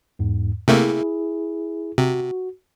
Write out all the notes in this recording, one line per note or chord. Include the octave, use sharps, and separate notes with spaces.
E2 G#2
C3 A3 A#3 E4 G#4
C3 F#4